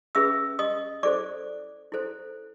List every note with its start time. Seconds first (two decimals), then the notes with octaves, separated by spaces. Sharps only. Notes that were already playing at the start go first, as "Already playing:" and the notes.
0.15 C#4 F4 G#4 B4 E5 E6
0.59 D#5 D#6
1.03 E4 A4 C5 D5 D6
1.92 E4 A4 C5